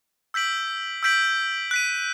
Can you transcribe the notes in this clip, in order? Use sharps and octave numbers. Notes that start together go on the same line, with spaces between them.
E6 G6 B6 D7 F#7
E6 G6 B6 D7 F#7
F#6 B6 D#7